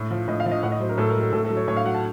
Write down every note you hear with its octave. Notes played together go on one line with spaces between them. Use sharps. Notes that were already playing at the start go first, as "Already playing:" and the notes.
Already playing: A2
F3
A2 D#5
F5
F3
D#5
A2 F#5
D#5
F#3 C5
A#4
A2 A4
A#4
F#3
A4
A2 A4
A4
F#3
C#5
A2 C#5
F5
F#3 F#5
A5